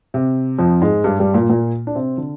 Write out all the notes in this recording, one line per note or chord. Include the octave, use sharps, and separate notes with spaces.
C3
F2 F3
G#2 G#3
G2 G3
G2 G3
A#2 A#3
A#2 A#3
D4
C3 C4
D3